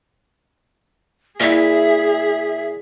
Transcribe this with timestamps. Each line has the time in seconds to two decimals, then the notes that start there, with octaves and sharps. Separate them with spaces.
1.40 A#2 E4 G#4 E5